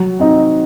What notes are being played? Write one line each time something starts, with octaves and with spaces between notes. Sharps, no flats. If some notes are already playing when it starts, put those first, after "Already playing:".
Already playing: F#3
C4 D#4